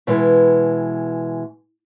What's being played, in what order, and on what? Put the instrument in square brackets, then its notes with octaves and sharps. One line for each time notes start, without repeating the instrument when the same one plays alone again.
[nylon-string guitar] B2 E3 G#3 B4